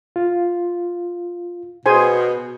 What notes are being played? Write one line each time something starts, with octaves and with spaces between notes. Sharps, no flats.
F4
B2 G#4 C5 G#5